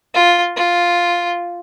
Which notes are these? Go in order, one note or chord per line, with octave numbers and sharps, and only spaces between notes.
F4
F4